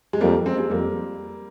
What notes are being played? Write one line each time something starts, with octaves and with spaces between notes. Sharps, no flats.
G#3
F2 G3 A#3
G#3 C4
G#3 C4
F2 G3 A#3